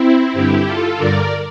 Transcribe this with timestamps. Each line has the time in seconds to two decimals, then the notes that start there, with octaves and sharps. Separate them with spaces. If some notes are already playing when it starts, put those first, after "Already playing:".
Already playing: C4 E4
0.33 G2 D3 E4 G4
0.65 F4 A4
0.97 G2 D3 A#4 D5